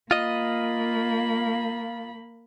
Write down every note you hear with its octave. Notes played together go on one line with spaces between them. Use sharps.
A#3 F4 D#5 B5